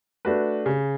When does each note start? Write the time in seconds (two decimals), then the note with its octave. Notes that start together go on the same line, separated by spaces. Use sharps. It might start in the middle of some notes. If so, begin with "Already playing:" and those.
0.25 A3 D4 F#4 B4
0.66 C#3